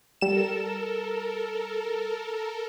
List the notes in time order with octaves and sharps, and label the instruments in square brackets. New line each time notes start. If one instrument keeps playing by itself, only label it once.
[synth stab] G3 E7 [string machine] A4 A#4